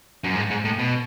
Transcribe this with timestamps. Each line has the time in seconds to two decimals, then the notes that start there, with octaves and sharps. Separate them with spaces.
0.24 F#2
0.36 G#2
0.50 G#2
0.65 A2
0.79 B2